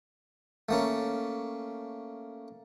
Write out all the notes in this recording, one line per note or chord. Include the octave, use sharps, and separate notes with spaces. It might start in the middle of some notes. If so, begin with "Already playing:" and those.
A3 A#3 C#4